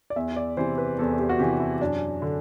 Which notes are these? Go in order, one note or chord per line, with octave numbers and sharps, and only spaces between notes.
D5
E2 E5
D5
C3 E3 C5
B4
E2 A4
G4
F#4
C3 E3 G4
E4
F#2 D4
D3